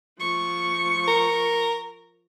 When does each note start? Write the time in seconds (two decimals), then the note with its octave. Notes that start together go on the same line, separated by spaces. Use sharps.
0.19 F3 C#6
1.08 A#4